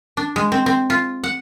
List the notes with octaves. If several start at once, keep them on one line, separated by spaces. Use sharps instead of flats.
D4
G#3
C4
C4
F4
F#5